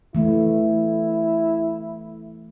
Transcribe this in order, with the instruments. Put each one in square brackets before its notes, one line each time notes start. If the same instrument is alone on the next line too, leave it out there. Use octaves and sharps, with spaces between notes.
[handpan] E3 A3 [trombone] E4